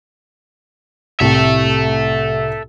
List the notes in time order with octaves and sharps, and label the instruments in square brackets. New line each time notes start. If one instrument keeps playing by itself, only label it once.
[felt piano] C2 A2 G4 [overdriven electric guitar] A4 E5